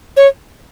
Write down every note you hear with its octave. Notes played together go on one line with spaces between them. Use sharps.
C#5